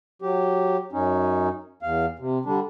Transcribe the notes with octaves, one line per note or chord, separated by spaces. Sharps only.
F#3 G4
F#2 C#4 D#4
E2 F5
C3
D3 G3 D4